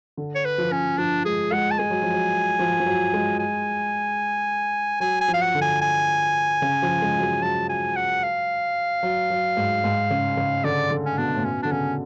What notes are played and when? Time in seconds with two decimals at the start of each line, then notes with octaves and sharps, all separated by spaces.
0.17 D3
0.35 C#5
0.45 B4
0.58 F3
0.72 C#4
0.98 F3 D4
1.25 G#3 G#4
1.52 G#3 F#5
1.71 A5
1.79 G#3 G#5
1.90 F#3
2.02 F3
2.13 F#3
2.59 F3
2.80 F3
2.86 F#3
3.14 G#3
3.39 G#5
5.00 F#3 G#5
5.21 G#5
5.28 F3
5.34 F5
5.41 F#5
5.55 D3
5.61 G#5
5.81 G#5
6.62 C#3
6.82 F3
7.02 G#3
7.18 F#3
7.22 G#3
7.42 F#3 A5
7.69 G#5
7.96 F#5
8.23 F5
9.03 F#3
9.30 F#3
9.57 G#2
9.84 G#2
10.10 C#3
10.37 C#3
10.64 D3 D5
10.91 D3
11.06 C#4
11.18 B2 D4
11.35 A2
11.44 B2 C#4
11.63 D3 D4
11.72 C#3 C#4